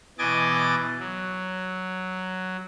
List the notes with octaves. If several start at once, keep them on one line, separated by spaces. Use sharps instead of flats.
B2 E3 D#5 G#5 D6 A6
F#3